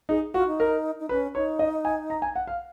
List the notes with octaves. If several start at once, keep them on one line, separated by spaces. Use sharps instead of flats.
D#4 G#4
F4 F#4
D#4
A#4
D#4
C#4 B4
D#4 C#5
D#5
G#5
A#5
G#5
F#5
F5